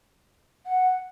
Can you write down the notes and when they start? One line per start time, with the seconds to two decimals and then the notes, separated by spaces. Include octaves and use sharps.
0.66 F#5